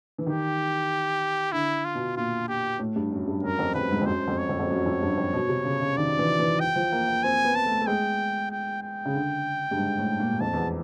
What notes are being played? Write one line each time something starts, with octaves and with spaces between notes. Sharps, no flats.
E3
D#3 G4
D3 E4
F4
B2
A#2 F4
G4
A2
G2
F#2
G2
F#2 A#4
F2
F2 B4
G#2
F2
F#2 C5
F2
C#5
F2
F2
F#2
F2
G2
F2
B2
C3
C#3
C#3
D#3 D5
E3
E3
G5
F3
A#3
A#3
C4 G#5
B3
A5
A3
A3
G#3 G5
G5
G5
C#3
D3
G2
G#2
A2
A#2
F2 A5
E2